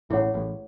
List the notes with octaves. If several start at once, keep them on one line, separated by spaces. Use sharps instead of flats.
A1 A2 E4 G#4 C#5 F#5
A1 A2